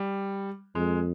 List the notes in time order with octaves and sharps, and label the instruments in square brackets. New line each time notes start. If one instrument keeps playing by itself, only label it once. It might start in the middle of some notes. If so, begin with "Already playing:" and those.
Already playing: [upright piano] G3
[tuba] F2 [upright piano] G#3